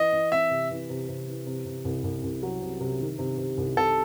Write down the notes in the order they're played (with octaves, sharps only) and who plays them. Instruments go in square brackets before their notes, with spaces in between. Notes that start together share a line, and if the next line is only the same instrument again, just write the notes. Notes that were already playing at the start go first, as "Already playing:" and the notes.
Already playing: [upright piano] E3 [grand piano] D#5
[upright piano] E3
[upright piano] C4 [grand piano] E5
[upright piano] C3
E3
C3
C3
E3
C3
C3
C2
C2
C2
F#3
C3
C3
D#3
C3
C3
C2
[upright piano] C3 [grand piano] A4